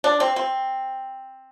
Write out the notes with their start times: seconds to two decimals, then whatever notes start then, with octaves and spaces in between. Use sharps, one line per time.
0.04 D4
0.20 C4
0.36 C4